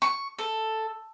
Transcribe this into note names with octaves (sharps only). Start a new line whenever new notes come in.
C#6
A4